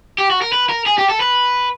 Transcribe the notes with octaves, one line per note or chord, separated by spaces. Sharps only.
G4
F#4
A#4
B4
A#4
G#4
G4
A4
B4